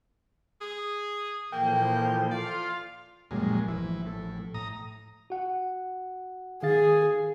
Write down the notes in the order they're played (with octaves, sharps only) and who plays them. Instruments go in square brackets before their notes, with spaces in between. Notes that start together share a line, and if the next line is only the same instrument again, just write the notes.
[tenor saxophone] G#4
[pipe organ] A#2 E3 F3 [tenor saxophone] A#3 [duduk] A4 [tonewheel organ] G5
[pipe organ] F4 F5 [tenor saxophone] D5
[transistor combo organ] F#2 A#2 G#3 [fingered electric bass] F3 G3
[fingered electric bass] A1 F3 [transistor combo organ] E3
[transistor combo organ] A2
[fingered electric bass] A2 [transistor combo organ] A#5 D#6
[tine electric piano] F#4 F#5
[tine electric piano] D#3 F5 A6 [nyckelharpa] G#4